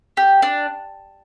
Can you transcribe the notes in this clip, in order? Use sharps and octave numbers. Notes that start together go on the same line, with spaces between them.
G4
D4